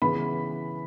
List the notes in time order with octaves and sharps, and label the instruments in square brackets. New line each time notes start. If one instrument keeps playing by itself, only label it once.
[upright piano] C#3 E3 B3 B5